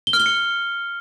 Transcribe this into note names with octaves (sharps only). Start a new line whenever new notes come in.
G7
F6
G7
C#7